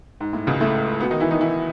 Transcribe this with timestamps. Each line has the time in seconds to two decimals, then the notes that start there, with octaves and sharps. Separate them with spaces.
0.20 G#2
0.33 A2
0.47 C#2 C#3
0.61 A2 A3
1.00 B2 B3
1.11 D#3 D#4
1.20 E3 E4
1.31 D#3 D#4
1.41 E3 E4